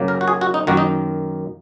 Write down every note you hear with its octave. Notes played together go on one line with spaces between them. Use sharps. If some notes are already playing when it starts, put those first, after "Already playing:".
Already playing: F#2 C#3 F#3 A#3
A#4
F#4
G#4
F#4
D#4
F#2 D#3 A#3 F#4
D#4